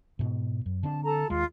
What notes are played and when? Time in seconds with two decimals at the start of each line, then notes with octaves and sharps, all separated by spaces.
0.19 G#2 B2
0.66 F#2
0.83 D3 C4 D4 A5
1.04 A4 A5 A#5
1.30 D#2 G#3 F4